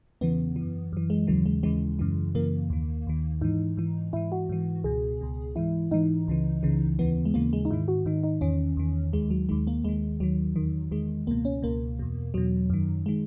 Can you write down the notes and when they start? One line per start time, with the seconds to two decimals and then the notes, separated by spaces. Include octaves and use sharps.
0.21 E2 C#3 E3 B3
0.56 E3
0.61 F#2
0.93 F#2 E3
1.10 G#3
1.27 D#2 C#3 E3 F#3
1.46 G#3
1.63 D#2 C#3 E3 G#3
1.99 F#2 C#3 E3
2.35 F#2 C#3 E3 A#3
2.70 D#2 D#3
3.07 D#2 D#3
3.41 G#2 E3 D#4
3.77 G#2 E3
4.13 G#2 E3 E4
4.32 F#4
4.49 G#2 E3
4.84 C#2 B2 G#4
5.21 C#2 B2
5.56 G#2 E3 E4
5.91 G#2 E3 D#4
6.28 C#2 C#3 E3
6.63 C#2 C#3 E3
6.99 D#2 C#3 E3 B3
7.25 G#3
7.34 D#2 C#3 E3 A#3
7.53 G#3
7.65 D#4
7.71 G#2 D#3 E4
7.88 F#4
8.05 G#2 D#3 D#4
8.23 D#4
8.41 E2 D#3 C#4
8.77 E2 D#3
9.13 D#2 D#3 G#3
9.30 F#3
9.49 D#2 D#3 G#3
9.67 A#3
9.84 D#2 D#3 G#3
10.20 D#2 D#3 F#3
10.56 E2 D#3
10.91 E2 D#3 G#3
11.27 C#2 B2 A#3
11.45 C#4
11.62 C#2 B2 A#3
11.99 E2 B2
12.34 E2 B2 F#3
12.70 F#2 D#3
13.06 D#3 G#3